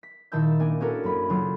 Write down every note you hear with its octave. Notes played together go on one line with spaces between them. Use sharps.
B6
A#2 D#3 E4 A5 E6 G6
A#3 D4 G#5
C#4 D4 F#4 A4 A#4
F#2 A#3 B5
C#3 F#3 F4 A4